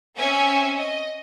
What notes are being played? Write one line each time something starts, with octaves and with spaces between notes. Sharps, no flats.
C4 C#4 E5 G#5
D#5